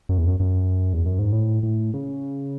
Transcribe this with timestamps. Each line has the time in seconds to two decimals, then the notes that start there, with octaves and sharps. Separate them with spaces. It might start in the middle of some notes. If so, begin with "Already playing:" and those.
0.09 F#2
0.18 E2
0.27 F#2
0.40 F#2
0.93 E2
1.06 F#2
1.19 G#2
1.32 A2
1.63 A2
1.94 C#3